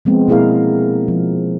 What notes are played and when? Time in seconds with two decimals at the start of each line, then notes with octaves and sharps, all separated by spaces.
0.05 F3 G#3 B3 C4
0.28 B2 A#3 E4 G#4 A#4 F5
1.08 F3